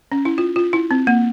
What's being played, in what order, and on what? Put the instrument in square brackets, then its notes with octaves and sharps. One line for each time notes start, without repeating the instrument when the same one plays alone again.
[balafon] C#4
E4
F4
F4
E4
C4
A#3